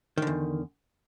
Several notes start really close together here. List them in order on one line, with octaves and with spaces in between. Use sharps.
D#3 D3 E2